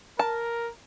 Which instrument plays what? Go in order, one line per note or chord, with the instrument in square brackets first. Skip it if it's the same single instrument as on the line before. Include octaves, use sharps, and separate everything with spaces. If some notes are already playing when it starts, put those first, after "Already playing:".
[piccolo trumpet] A#4 [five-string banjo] A5